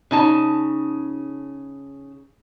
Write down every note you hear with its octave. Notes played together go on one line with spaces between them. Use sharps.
C#3 D#4 A5